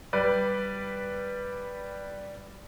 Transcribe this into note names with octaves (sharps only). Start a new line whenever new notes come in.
G3 B4 D5